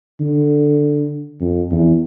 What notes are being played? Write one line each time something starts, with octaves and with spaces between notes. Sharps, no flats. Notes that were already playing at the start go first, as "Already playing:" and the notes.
D3
F2
E2